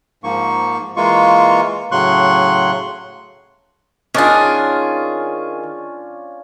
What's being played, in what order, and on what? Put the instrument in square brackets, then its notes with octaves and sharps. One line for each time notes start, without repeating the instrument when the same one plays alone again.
[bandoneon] G#2 F3 A#3 C#6
E3 G#3 A#3 F4 C#6
A2 C#3 F#3 C6 C#6 F#6
[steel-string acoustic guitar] D#3 G#4 [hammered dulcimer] C#4 D4 F4